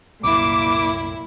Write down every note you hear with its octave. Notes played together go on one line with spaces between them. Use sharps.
C2 F#2 A#2 E4 D6